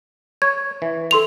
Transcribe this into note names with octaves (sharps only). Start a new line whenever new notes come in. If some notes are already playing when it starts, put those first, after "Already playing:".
C#5 G#6
E3
A4 C6 F7